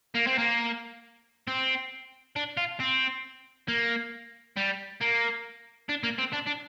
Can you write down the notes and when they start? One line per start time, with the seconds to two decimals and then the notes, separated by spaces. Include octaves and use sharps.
0.15 A#3
0.27 C4
0.38 A#3
1.48 C4
2.36 D4
2.57 F4
2.80 C4
3.68 A#3
4.57 G3
5.01 A#3
5.89 D4
6.03 A#3
6.19 C4
6.33 D4
6.47 D4